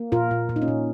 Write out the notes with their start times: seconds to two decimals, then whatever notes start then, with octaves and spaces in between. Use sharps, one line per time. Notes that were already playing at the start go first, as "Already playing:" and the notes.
Already playing: A#3
0.12 A#2 F4 A#4
0.31 A#2
0.49 A#2
0.56 D#4
0.62 C#4
0.68 A#2